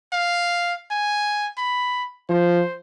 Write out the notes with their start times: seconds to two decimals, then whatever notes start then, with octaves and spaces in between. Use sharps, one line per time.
0.13 F5
0.91 G#5
1.58 B5
2.30 F3 C5